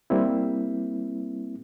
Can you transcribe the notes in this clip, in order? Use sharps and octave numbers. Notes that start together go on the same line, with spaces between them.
G3 A#3 C4 E4